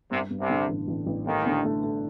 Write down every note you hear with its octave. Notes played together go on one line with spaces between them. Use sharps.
C2 G2 C3
G2
C2 C3
D3
A1
A1
A1
D#2 D#3 A3
D3
A3
A3